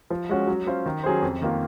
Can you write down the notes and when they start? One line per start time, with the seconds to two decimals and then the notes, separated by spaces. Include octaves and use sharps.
0.10 F3
0.29 G#3 C#4 F#4
0.47 F#3
0.67 C#4 F4 C5
0.86 D#3
1.04 F#3 C#4 G#4 C5
1.22 F2
1.42 D#3 A#3 F4